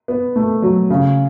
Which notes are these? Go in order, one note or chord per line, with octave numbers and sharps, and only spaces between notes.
B3
A3
F#3
C#3